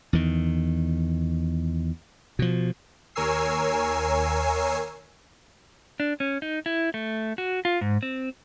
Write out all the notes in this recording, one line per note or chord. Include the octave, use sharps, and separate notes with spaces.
E2 D#3
B2 F3
D#2 A#4 C#5 G#5 E6 C7
D4
C#4
D#4
E4
A3
F#4
F4
G#2
C4